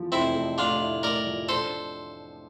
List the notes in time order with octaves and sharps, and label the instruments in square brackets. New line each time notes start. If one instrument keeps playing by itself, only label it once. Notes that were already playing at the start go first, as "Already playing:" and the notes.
Already playing: [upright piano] E2 F3
[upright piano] F1 [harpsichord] C4 E4
[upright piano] F1
[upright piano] A2 [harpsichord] D4 F4
[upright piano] E4
[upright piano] A2 [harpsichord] A#4 D5
[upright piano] F3
[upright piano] D4 [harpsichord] A4 C5